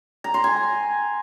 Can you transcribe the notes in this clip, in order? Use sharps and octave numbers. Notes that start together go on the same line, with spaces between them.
A#5
C6
G#5